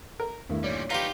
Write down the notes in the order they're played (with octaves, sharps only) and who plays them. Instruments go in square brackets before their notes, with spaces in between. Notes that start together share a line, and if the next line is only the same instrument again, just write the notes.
[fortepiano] A#4
[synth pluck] E2 D#3 A3 [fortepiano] G2 E4
[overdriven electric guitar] A#2 G3 [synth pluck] C#5 D5
[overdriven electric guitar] D#4 B4 [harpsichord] F4 G4 [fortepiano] A#5